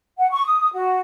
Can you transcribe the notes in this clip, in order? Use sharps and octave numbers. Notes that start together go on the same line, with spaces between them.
F#5
C#6
D#6
F#4